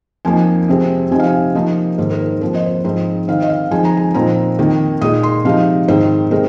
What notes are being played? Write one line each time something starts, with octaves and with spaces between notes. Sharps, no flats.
F2 F3 A#3 D#4 G#5
F2 C3 G#3 C4
C3 F3 C4 D#4 G#5
F5
G#5
C3 F3 A#3 D#4 D#5
G#2 D#3 A#3 C5
A#4
C5
F2 F3 A#3 C5
D#5
C5
G#2 F3 C4 D#4 C5
D#3 C4 D#4 F5
D#5
F5
F2 F3 G#3 D#4 G#5
A#5
G#5
A#2 F3 C4 D#4 A#5
F2 D#3 A#3 D#4
A#2 G#3 D#4 D#6
C6
C3 F3 G#3 D#4 F5
G#2 D#3 C4 C5
C3 G#3 C4 D#4 A#4